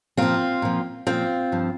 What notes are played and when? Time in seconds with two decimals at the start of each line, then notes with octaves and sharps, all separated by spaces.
0.17 A#2 F3 C4 F4
0.62 A#2 F3
1.07 A#2 F3 C4 F4
1.52 G2 F3